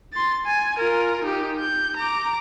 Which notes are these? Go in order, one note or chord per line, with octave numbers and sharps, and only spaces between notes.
C6 A6
G#5
F4 A#4
D#4 G4
G6
A#5 D6